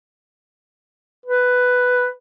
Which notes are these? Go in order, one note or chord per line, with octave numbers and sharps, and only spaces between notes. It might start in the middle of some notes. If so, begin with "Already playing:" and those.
B4